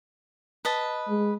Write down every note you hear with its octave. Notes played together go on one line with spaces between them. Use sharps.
B4 D#5 A5
G#3